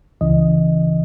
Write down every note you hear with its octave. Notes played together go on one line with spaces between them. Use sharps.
C#2 C#3 E3 D#5